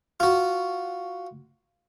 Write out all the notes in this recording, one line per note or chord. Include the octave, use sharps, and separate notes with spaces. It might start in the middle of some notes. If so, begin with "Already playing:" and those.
F4 F#4